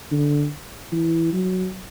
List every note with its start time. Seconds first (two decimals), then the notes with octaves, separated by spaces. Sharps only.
0.11 D3
0.92 E3
1.33 F#3